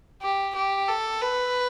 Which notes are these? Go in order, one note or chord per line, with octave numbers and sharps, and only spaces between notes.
G4
G4
A4
B4